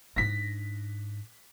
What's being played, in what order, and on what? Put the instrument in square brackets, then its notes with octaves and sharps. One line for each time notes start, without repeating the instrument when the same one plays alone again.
[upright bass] G#2 D4 [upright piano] A#6 B6